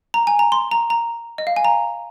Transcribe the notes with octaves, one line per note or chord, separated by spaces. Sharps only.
A#5
G#5
A#5
C6
A#5
A#5
D#5
F5
G#5
A#5